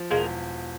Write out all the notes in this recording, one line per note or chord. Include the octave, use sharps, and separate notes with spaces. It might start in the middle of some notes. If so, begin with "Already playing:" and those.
Already playing: F3
E1 G#3 A#3